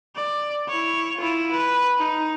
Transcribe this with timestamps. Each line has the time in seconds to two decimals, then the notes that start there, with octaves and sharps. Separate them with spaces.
0.16 D5
0.68 E4 C#5
1.17 E4 F4
1.51 B4
1.98 D#4